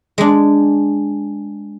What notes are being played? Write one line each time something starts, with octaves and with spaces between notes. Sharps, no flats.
G#3 D4